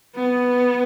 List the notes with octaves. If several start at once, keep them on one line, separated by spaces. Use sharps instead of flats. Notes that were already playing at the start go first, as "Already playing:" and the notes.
B3